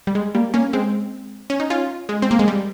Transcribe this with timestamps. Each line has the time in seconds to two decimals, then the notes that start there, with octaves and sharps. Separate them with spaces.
0.07 G3
0.15 G#3
0.35 G3 A#3
0.54 A#3 C#4
0.73 G#3 C4
1.50 C#4
1.60 D#4
1.70 C#4 F4
2.09 G#3
2.22 C4
2.31 A#3
2.39 G#3
2.48 G3